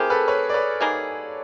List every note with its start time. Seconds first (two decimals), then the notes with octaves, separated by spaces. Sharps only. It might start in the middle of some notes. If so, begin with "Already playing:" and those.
Already playing: A3 C4 E4 G4 G#4 A#4
0.10 A4 B4
0.28 B4 C#5
0.49 D5
0.54 B4 C#5
0.80 G3 A#3 D#4 G#4